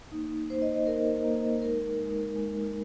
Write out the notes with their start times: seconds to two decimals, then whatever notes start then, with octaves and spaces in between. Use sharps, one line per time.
0.12 A#3 D#4
0.50 A#3 D#4 C5
0.62 D#5
0.75 D#5
0.87 A#3 D#4 A#4
1.24 A#3 D#4
1.62 G#3 D#4 A#4
1.99 G#3 D#4
2.36 G#3 D#4